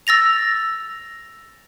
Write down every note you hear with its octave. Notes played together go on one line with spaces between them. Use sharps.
E6 A6 A#6 F7